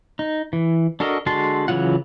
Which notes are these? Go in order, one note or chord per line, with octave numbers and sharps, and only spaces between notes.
D#4
E3
D4 F#4 A4 A#4 D#5
D3 G#3 F#4 A5 C6
C#3 E3 F#3 F4 F#5